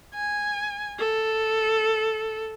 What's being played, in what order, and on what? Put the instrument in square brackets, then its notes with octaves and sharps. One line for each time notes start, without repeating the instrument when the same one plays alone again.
[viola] G#5
A4